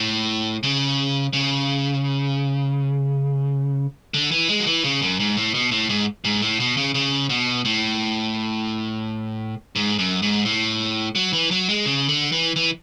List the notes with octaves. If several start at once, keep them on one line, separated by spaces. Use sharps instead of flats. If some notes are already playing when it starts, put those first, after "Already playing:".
Already playing: A2
C#3
C#3
D3
E3
G#3
F#3
E3
C#3
F#2
G#2
A2
B2
A2
G#2
G#2
A2
B2
C#3
C#3
B2
A2
G#2
F#2
G#2
A2
F#3
E3
F#3
G#3
C#3
D3
E3
E3